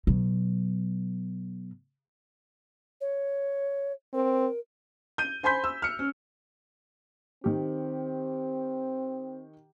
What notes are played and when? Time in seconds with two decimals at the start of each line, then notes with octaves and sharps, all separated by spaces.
0.07 B2 F#3
3.01 C#5
4.14 C4 A#4
5.18 G6 D#7
5.43 C5 G#5 B5 C6 G6 B6
5.64 E6
5.82 F6 C#7
5.99 C#4
7.44 D#3 C4 G4